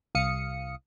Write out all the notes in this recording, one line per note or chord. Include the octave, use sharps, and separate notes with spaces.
C2 F5 D#6 C#7